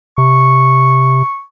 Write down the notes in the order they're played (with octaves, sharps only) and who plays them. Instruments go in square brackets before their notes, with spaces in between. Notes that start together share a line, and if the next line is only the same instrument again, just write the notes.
[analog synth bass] C3 [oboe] C#6